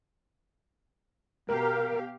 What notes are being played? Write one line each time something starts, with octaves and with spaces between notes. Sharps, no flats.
B2 G4 A#4 F5